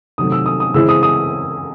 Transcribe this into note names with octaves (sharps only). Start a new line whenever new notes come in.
C3 D#3 F#3 A3 D#6
E6
D#6
D#6
C#3 E3 G#3 C4 E4 E6
D#6
D#6